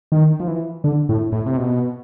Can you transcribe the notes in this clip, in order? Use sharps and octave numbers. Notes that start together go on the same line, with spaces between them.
D#3
F3
E3
D3
A2
A2
C3
B2